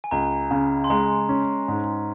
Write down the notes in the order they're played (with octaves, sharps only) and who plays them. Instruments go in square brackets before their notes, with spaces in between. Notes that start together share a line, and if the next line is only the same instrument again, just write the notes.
[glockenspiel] G#5
[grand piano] C#2 [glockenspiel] A#5
[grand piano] C#3
[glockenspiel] C6
[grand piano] G#3 [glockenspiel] A#5
[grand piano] C#4
G#2